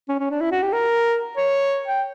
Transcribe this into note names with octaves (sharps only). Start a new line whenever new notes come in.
C#4
C#4
D4
E4
F#4
G4
A#4
C#5
G5